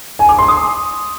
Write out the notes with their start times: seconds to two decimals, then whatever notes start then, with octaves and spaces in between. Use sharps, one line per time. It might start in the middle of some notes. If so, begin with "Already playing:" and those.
0.19 G#5
0.29 D6
0.39 C6
0.48 D#6